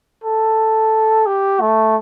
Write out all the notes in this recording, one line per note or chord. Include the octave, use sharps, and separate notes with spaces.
A4
G4
A3